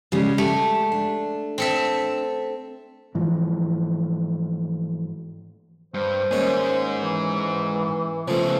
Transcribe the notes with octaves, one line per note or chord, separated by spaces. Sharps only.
C#3 G3 G#3
G#3 A3 G4
D4
C4 A4 E5
G#2 E3 F3
G2 C5
D#2 G#2 C#4 G#4
E3
C#3 F3 A3 B3